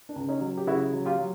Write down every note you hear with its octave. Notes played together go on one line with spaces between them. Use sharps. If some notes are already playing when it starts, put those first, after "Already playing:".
D4
C#2
C#4 D#4
F#3
G4
C#3 E4 F#4
F#3
F4 G4
F#3